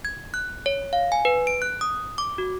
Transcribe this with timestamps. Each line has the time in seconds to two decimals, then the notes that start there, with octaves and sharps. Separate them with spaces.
0.05 G#6
0.34 F#6
0.66 C#5
0.93 F5
1.12 G#5
1.25 B4
1.47 D7
1.62 F#6
1.81 D#6
2.18 D6
2.38 F#4